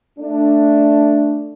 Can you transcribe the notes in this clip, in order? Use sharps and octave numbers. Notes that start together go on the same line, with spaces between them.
A3 D4